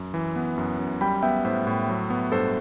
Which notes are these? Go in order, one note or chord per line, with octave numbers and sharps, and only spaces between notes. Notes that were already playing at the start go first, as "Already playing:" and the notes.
Already playing: F#2
E3
B3
F#2
F#2
G3 G5 B5
B3 E5 G5
A2 C5 E5
A2
F#3
B3
G2 A4 C5